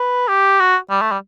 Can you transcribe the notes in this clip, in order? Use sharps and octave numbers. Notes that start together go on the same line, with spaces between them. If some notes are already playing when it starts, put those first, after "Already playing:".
Already playing: B4
G4
F#4
G3
A3
G3